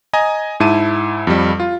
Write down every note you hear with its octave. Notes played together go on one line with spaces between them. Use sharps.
D#5 G#5 A#5
G#2 E4 A5 D#7
F2 G3
F4